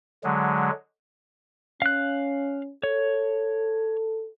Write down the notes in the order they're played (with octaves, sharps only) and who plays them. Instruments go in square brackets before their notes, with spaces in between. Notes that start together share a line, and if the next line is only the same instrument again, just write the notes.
[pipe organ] D3 F#3 G#3
[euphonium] C#4 [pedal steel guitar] F5 F#6
[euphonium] A4 [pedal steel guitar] C#5